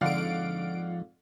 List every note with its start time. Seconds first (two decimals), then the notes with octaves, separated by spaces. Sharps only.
0.01 F2 G#2 D3 F3 D5 F5 F#5 D7